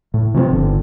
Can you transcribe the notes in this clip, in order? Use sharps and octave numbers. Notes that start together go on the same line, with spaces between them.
A2
C3 F3 B3 C4
G1 D3